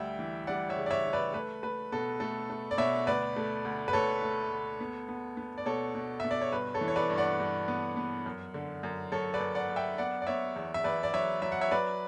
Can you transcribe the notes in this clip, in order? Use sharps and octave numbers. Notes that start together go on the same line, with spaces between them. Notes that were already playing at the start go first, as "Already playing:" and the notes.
Already playing: D2 G3 E5 G5
E3
G3 D5 F#5
C#5 E5
C#3
D5
C#5 E5
C#3
B4 D5
A3 B4
A3 B4
B2 A4
A3 A4
A3
D5
B2 C#5 E5
D2 B4 D5
A3
D2
B4
D2 A4 C#5
A3
D2
B3
B3
B3
D5
B2 A4 C#5
B2
B2 E5
D5
C#5
G2 B4
A4 C#5
E3
C#5
B4 D5
G2
D5 F#5
G2
B3
B3
F#2
D3
F#2
F#2 A4 C#5
B4 D5
F#2
D5 F#5
F#2
E5 G5
B3 D5 F#5
D5
B3 C#5 E5
E2
E5
E2 B4 D5
D5
F#3 C#5 E5
F#3 E5
F#5
C#5 E5
F#3 B4 D5